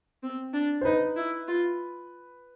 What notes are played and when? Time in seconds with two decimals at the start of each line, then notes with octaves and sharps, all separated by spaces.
0.23 C4
0.54 D4
0.81 C5
0.85 D#4 B4
1.16 E4
1.48 F4